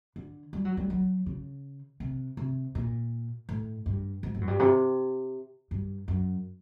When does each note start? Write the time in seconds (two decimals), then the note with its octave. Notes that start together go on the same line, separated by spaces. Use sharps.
0.16 D3
0.53 G3
0.65 F#3
0.77 G3
0.90 F#3
1.26 C#3
2.00 C3
2.37 C3
2.75 A#2
3.49 A2
3.86 G2
4.23 G#2
4.35 G#2
4.41 F#2
4.48 G2
4.59 C3
5.71 G2
6.08 F#2